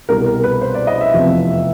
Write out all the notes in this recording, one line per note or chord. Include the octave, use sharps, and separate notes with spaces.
C2 B2 G3 A#4
A#4
B4
C5
D5
D#5
E5
F1 E2 C3 F3